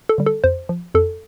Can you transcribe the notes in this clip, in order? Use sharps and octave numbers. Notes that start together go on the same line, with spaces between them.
A4
D3 G3
A4
F2 C5
F3
F2 A4